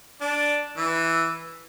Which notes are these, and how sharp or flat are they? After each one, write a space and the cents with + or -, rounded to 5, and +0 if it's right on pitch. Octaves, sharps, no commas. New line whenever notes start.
D4 -5 D5 +0
E3 +0 E6 +0